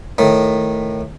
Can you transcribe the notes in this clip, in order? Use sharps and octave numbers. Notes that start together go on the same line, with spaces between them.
A2 D#3